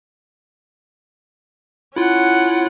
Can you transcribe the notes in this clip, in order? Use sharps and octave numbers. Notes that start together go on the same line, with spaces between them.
C#4 E4 F4 F#5